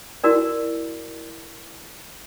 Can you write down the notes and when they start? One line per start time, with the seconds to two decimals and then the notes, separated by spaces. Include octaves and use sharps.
0.24 E4 F#4 A#4 D5